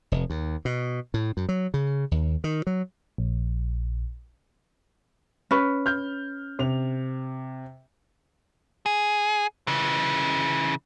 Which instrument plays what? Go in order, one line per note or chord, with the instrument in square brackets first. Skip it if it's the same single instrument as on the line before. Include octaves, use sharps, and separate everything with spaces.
[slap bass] F1
D#2
B2
A2
F#2
F#3
C#3
D#2
D#3
F#3
[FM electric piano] A#1
[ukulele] C#4 B4
[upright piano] F6 G6
C3 F7
[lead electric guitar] G#4
C#3 E3